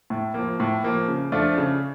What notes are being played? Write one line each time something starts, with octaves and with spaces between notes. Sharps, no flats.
A2
F3 A#3
A2
F3 A#3
C#3
F3 A3 D4 F4
C#3